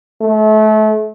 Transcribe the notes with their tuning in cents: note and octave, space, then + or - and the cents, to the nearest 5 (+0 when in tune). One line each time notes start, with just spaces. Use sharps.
A3 -30